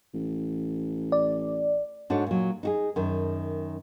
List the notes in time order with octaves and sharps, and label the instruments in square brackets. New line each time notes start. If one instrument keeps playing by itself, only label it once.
[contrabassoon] A1
[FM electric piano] D5
[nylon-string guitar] G#2 D4 F#4 A4 C#5
A#2 F#3
D#4 F#4 G#4
F#2 D#3